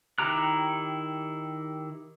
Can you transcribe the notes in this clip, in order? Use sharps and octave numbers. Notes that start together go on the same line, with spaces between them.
D#3 E4 G4 A#5 F#6